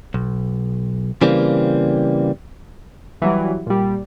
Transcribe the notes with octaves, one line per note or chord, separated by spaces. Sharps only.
B1
C#3 E3 G3 A#3 C4
E3 F#3 G3
A#2 G3